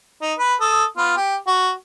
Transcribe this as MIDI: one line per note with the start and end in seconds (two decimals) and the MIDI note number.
0.22 0.33 63
0.39 0.54 71
0.61 0.84 69
0.61 0.84 87
0.97 1.13 59
0.97 1.13 65
1.17 1.36 67
1.47 1.71 66